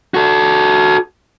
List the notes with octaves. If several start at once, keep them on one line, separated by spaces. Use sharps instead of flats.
F#4 A4